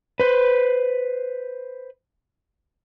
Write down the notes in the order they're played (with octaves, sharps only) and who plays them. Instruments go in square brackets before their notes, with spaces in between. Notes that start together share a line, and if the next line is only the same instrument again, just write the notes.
[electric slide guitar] B4 C5